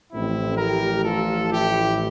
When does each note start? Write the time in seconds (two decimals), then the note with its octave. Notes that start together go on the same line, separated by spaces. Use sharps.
0.12 A1 A2 F3 C4 E4
0.57 G4 A#4
1.04 F4 A4
1.51 E4 G4